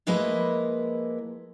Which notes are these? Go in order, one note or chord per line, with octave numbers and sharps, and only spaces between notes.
F3 G#3 A#3 E4 B4 D#5